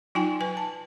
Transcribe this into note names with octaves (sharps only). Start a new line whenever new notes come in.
F#3 D#4 F4 G5 G#5
B4 G#5
A5